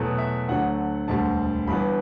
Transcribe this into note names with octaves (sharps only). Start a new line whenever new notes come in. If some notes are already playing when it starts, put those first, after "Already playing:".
Already playing: E2 B2 F#3 A3
E5
D2 D3 F#3 A3 F#5
E1 D2 D3 G3 A5
G1 G2 E3 B3 B5